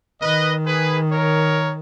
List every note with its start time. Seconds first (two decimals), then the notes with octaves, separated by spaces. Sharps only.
0.21 D#3 B4 D#5
0.67 G#4 B4
1.11 A#4 C#5